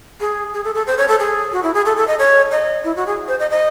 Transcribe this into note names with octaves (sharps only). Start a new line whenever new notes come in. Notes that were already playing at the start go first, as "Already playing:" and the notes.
G#4
G#4
A4
A4
C5
C#5
A4
G#4
F#4
E4
G#4
A4
A4
D#5
C#5
D#5
E4
F#4
G#4
C5
D#5
D#5